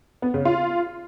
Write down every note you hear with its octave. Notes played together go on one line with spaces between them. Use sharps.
B3
C#3
F4